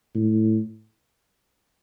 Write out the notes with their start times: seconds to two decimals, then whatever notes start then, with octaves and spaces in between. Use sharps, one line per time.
0.15 A2